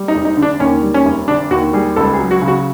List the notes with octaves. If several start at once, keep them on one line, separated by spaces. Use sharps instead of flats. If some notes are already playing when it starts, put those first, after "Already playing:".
Already playing: G3
D#4
F1
D#4
D3
D4
D#2 C#4
G3
C#4
F1
D3 D4
D#2 F#4
G3 G#4
C#2 A4
G#4
F#3
F#4
C#3
F#4